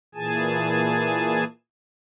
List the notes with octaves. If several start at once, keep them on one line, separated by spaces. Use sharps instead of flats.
A#2 E3 G#4 G#5 A5